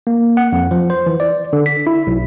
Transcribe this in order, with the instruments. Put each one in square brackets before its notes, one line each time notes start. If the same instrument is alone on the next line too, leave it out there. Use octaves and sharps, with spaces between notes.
[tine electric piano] A#3
F#5
F2
F3
C5
E3
D5
D3
B6
E4
B1